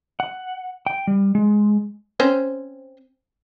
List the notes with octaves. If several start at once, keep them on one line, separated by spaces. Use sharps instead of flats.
F#5
G5
G3
G#3
C4 C#4 C5